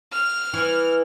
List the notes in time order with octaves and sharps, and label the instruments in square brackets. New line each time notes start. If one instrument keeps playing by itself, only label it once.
[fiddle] F6
[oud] E3